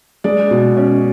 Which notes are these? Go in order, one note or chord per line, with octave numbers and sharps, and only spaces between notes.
G#3 D5
B2
C#4